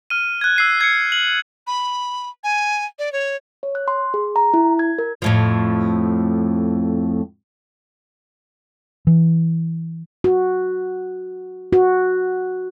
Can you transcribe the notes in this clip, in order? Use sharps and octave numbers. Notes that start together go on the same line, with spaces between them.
F6 D#7
F#6 G#6
E6 C7 D#7
G#6 C7 C#7
F#7
B5
G#5
D5
C#5
C#5
F#6
C6
G#4
A#5
E4
G#6
A#4
F2 A2 F3
E3
F#4
F#4